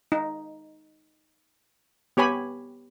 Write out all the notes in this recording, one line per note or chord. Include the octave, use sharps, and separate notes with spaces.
D#4
B3 G4 C#5 G#5 B5